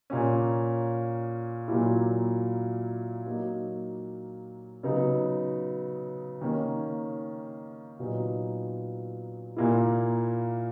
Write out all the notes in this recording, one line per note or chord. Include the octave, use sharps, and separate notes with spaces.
A#2 A#3 C#4
A#2 F#3 A#3 E4
F#3 A#3 D#4
C#3 F#3 B3 D#4
D#3 A#3 C#4
A#2 F#3 B3 D#4
A#2 A#3 E4